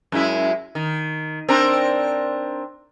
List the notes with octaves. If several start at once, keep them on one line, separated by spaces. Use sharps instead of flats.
F#2 G#3 E4
D#3
C4 D4 A#4